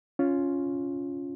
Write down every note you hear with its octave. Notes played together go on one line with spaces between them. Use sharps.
C#4 F4